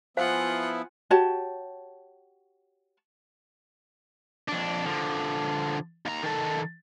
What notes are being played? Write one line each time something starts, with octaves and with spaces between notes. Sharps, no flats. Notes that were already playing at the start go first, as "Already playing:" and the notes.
F3 B3 E4 F4 C5 F5 F#5 G#5
F#4 G4 C#5 A5
F2 D4
D3 F3
D#2 A#5
D#3 A4